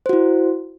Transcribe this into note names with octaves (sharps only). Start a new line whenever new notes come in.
E4 F#4 C5